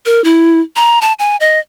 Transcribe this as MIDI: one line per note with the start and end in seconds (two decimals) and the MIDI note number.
0.06 0.23 70
0.24 0.60 64
0.76 0.99 82
1.02 1.13 81
1.19 1.37 80
1.40 1.59 75